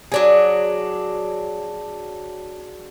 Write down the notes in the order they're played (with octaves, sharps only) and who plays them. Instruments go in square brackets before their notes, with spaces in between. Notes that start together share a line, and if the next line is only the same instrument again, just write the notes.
[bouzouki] F#3 D4 G#4